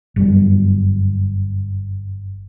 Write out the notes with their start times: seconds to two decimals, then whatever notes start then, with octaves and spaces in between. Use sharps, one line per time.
0.16 G1 F#2 G3